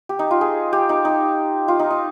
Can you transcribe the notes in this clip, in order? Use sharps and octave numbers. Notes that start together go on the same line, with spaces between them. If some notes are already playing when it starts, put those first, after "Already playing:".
G4
D#4
F4
G#4
G4
D#4
D#4
F4
D#4
D#4